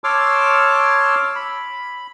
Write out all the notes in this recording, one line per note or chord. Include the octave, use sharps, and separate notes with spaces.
C#5 A5 C6 D6 E6 F6
B5